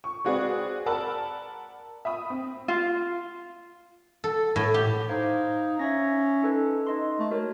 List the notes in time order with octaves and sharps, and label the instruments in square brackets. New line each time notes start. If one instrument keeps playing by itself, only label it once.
[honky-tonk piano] C#6
G#3 C4 F#4 G#4 B4 D5
A#4 D5 F#5 A5 B5 E6
E5 B5 D#6
C4
[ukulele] F4
[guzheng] A4
A2
G4
[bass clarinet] D#4 [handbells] C5 F5 G#6
[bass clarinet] C#4 [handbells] E5 G#6 A#6
[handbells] D#4 A4 B4
D#4 D#5 C6
[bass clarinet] A3
[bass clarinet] A3 [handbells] F#4 A#4 C#5